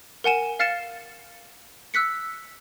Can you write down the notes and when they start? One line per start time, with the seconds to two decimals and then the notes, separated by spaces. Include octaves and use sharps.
0.24 A#4 F#5 G#5 E7
0.59 F5 F6 A6 C#7 E7
1.94 E6 F#6 B6 C#7